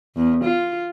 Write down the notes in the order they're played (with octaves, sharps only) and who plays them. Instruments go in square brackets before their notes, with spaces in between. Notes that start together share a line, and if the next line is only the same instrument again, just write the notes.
[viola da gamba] E2
F4